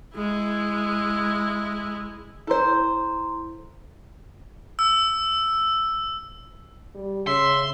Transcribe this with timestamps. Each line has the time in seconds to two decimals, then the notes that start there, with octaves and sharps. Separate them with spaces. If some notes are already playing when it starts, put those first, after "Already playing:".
0.15 G#3 E4
2.47 E4 A4 C5 A#5 C6
4.79 E6
6.95 G3
7.27 C#3 C#5 E5 C6